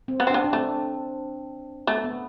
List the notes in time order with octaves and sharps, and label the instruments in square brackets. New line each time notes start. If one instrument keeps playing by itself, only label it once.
[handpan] C4
[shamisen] B3
C4
[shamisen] B3 [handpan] D4
[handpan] D4
[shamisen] A3 [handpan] C4
[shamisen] A3 [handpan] B3
[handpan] B3